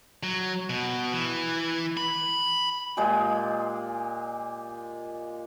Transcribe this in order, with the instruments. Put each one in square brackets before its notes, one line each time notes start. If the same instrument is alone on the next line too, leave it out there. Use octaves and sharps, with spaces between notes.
[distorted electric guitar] F#3
B2
E3
B5
[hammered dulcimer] A#2 G#3 G4